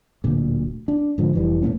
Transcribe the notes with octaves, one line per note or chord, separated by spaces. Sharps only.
D1 D2 A#2
D4
G#2 D3 F3
F1 E3 G3
E1 A#2 A3 C#4